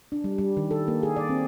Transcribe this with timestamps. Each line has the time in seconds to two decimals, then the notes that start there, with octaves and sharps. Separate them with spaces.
0.12 D4
0.24 G3
0.38 G3
0.57 D#3
0.71 A4
0.88 A#3
1.03 G#4
1.16 D5
1.29 C4